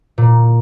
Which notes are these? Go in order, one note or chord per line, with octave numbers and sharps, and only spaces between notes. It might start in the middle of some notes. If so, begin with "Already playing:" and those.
A#2